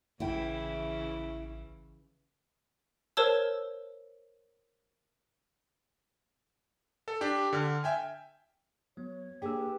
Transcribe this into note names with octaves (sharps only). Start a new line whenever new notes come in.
A1 C#3 E3 E4 G5
A#4 C5 C#5 A5 E6
A4
D4 G4 G5
D3 F6
E5 G5 G#5
F#3 B3 C#5
A#3 D4 G4 G#4 E6
B4